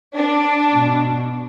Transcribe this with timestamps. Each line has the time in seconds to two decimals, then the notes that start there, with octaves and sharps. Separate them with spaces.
0.15 D4
0.75 B2